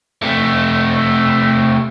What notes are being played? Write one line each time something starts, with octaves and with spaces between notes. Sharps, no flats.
C3 A3